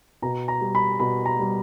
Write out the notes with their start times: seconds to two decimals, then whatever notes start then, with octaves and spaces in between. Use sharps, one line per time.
0.22 B2 A#5
0.48 A#5
0.61 G3
0.75 B5
1.00 B2 B5
1.25 A#5
1.39 G3